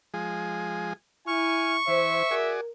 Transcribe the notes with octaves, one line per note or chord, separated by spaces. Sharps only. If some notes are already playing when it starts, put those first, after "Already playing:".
F3 G#3 G#4
E4 G#5 C#6 F6
E3 C5 E5
F#4 G#4 A#4 D5